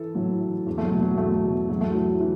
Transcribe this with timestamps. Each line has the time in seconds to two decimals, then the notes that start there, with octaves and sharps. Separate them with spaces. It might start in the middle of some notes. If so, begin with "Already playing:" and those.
Already playing: E3 A4
0.15 A2 F#3
0.40 E3
0.66 E2
0.78 A3
0.83 F#3
0.92 B2
1.01 F#3
1.18 E2 A3
1.43 B2
1.69 E2 F#3
1.81 A3
1.93 E3 F#3
2.20 E3